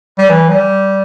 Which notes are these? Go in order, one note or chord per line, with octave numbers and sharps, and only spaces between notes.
G3
E3
G3